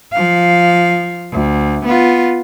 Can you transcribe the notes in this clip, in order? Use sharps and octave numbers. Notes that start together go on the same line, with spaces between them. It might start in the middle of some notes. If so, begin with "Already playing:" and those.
F3 F5
D2
B3 F4